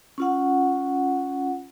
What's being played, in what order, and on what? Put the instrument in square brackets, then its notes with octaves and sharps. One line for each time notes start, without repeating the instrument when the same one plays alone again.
[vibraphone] C#4 F4 F#5